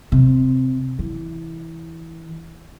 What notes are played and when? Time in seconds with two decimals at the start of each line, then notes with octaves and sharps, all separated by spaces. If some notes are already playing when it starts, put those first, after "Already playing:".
0.12 C3
0.99 E3